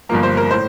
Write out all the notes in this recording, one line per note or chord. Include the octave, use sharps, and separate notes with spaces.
G1 G2 F3 A#3 A#5
C5
A#4
A2 C5